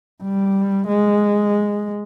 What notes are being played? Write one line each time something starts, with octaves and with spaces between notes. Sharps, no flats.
G3
G#3